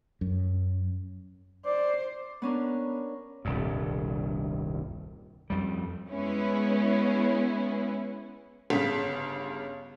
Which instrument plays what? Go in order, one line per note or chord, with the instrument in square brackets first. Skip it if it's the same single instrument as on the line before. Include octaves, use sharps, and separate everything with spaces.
[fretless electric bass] F#2
[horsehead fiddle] C5 [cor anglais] D5
[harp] B3 C#4 D4 A#4
[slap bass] D#1 C2 G2
F2 G3
[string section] G#3 B3 C#4 E4
[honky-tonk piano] G1 C#3 B6